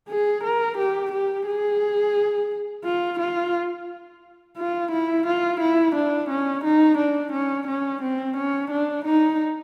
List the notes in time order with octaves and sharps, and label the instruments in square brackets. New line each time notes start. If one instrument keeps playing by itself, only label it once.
[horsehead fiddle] G#4
A#4
G4
G4
G#4
F4
F4
F4
E4
F4
E4
D4
C#4
D#4
D4
C#4
C#4
C4
C#4
D4
D#4